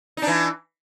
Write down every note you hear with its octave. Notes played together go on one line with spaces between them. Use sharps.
E3 D4 D#4